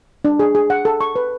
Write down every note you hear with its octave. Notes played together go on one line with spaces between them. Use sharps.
D4
G#4
G#4
F#5
A4
C#6
B4